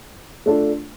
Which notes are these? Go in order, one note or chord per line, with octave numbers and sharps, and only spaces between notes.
A3 D4 F4 A4